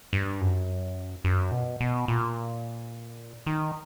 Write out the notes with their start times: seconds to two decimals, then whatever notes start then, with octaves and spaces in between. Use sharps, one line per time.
0.13 G2
0.41 F#2
1.24 F#2
1.51 B2
1.80 B2
2.08 A#2
3.46 D#3